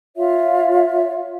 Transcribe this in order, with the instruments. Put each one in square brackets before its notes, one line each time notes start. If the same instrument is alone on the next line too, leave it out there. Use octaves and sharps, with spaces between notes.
[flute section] F4 C#5 E5